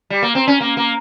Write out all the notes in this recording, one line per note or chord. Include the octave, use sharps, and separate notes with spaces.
G3
A#3
C4
C#4
A#3
A#3